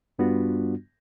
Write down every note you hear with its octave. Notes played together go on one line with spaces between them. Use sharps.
G2 G3 B3 D4 F4 F#4